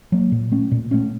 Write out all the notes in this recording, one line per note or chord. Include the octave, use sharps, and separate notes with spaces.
F#3 A#3
A#2
A3 C#4
A#2
A3 C#4